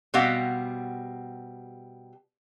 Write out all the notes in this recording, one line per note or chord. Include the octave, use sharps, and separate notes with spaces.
B2 G3 C4 G4 F5 F#5